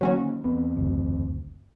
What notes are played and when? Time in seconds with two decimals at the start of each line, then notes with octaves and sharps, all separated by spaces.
0.01 D3 D#3 F#3 A#3 C#4 F#4
0.44 E2 B3 C4
0.77 F#1 D2